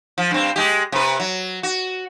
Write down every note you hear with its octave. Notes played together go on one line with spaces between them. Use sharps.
F3
G2 C4
G#3 G4
C3 B4
F#3
F#4